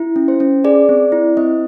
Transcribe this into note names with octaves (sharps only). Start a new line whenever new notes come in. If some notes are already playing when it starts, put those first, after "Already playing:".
Already playing: E4
C#4
C5
C#4
G#4 D5
C4
E4
C4 D#5